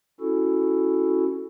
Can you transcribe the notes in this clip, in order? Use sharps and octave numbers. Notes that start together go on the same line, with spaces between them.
C#4 E4 F#4 A4